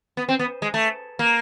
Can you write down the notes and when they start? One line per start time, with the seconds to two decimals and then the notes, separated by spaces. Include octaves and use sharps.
0.17 B3
0.29 C4
0.39 B3
0.62 G#3
0.74 A3
1.19 A#3